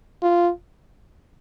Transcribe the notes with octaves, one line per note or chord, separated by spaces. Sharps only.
F4